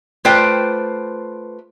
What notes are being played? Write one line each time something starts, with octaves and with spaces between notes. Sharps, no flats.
A3 F4 B4 C5 D5 G5